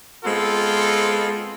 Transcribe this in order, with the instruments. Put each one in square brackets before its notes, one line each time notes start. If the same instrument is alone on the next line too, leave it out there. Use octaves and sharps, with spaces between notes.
[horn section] G#3 B3 C4 F4 A4